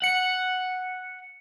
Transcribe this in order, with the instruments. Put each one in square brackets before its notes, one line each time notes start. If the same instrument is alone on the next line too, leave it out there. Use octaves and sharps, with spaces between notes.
[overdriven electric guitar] F#5 [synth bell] C#7